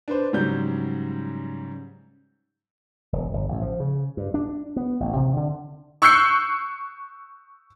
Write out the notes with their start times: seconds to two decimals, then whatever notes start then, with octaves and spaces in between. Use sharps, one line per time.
0.08 D4 B4 C5
0.33 G#2 C#3 F#3 G3 G6
3.13 E1
3.33 G1
3.48 A1
3.62 F3
3.80 C#3
4.17 G2
4.34 D4
4.76 B3
5.00 A1
5.16 C3
5.36 D3
6.02 C#6 E6 F#6 G6 C7 C#7